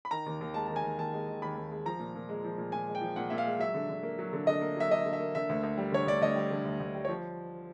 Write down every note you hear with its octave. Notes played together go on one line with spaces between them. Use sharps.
B5
D#3 A#5
D#2
D#2
G#3 A5
D#3 A5
G#5
D#2
D#2 A5
G#3
D#3
D#2 B5
D#2
G#3
F3 A#5
A#2
A#2
G#3
F3
A#2
A#2 G#5
G#3
G5
F3
A#2 F#5
A#2 E5
F5
G#3
F#3 E5
D3
D3
A#3
F#3
D3
D3 D#5
A#3
F#3 E5
D3 D#5
D3
E5
A#3
D3 E5
D2
D2
G3
D3 C#5
D2 D5
D2 D#5
G3
D3
D2
D2
G3
C#5
F3